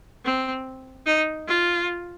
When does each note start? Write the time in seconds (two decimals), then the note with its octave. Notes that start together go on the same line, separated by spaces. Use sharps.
0.25 C4
1.06 D#4
1.48 F4